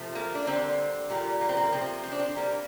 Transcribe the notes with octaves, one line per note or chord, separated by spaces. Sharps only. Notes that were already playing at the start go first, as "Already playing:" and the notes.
Already playing: C3 F3 A3
A#3
D4
D3 G3 A#3 C4
A#2 G3 A#3
A#3
C4
A#3
C3 F3 A3 C4
C4
D4
C4
C3 G3 A#3